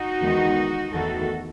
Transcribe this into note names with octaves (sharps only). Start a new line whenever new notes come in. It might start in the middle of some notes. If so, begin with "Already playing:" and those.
Already playing: D#4 F#4
E2 D#3 G#3
E2 D#3 A3 F#4 A4